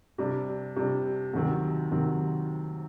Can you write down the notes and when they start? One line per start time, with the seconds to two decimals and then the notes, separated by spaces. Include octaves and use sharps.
0.18 C3 G3 D4
0.76 C3 G3 D4
1.34 D2 C3 D#3 F#3 C4
1.91 C3 D#3 F#3 C4